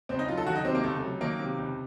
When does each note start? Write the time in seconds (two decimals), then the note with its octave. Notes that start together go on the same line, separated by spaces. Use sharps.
0.09 C#2 C4
0.19 D#4
0.28 F#3 F4
0.37 A4
0.46 D#3 F#4
0.56 D#4
0.65 C3 C4
0.75 A#3
0.83 C#2 A3
1.02 F#3
1.21 D#3 A#3
1.39 C3
1.59 C#2